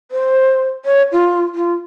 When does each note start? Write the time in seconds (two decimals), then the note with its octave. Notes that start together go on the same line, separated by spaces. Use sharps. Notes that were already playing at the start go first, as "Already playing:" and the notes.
0.11 C5
0.85 C#5
1.12 F4
1.55 F4